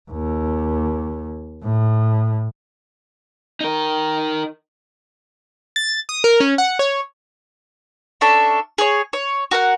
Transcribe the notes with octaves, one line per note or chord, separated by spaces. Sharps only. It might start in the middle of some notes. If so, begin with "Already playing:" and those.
D#2
A2
D#4 A#4
A6
D#6
A#4
C#4
F#5
C#5
C#4 D4 A4 E5
G#4 C#5
C#5
F#4 A#4 F#5